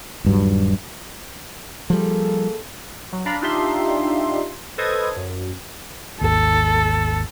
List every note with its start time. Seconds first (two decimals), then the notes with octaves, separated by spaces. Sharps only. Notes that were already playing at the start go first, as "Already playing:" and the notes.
0.24 D#1 G2 F#3
1.90 F3 G3 A#3 G#4 A4
3.12 F#3
3.26 D4 F5 A#5 B5
3.41 D4 D#4 F4 G4 E5 C6
4.78 A4 B4 C5 D#5 D#6 G#6
5.16 F#2
6.21 G#1 D#2 A4